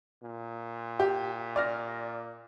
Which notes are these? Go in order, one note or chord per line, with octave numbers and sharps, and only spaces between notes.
A#2
G4
D5 F6 A#6